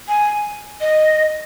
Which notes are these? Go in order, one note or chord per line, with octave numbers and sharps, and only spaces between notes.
G#5
D#5